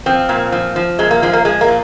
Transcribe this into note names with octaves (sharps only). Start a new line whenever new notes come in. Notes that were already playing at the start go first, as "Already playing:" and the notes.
F3 C4
A#2
F3
F3
A#2 G#3
A#3
F3 G#3
A#3
F3 G#3
A#3
A#2